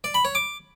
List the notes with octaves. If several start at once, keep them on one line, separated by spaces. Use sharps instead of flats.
D5
B5
C#5
D6